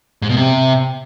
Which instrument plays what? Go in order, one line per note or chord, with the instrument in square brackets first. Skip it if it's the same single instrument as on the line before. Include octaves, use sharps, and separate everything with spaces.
[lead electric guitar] G#2
B2
C3